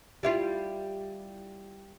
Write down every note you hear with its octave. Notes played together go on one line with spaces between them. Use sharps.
G3 E4 F4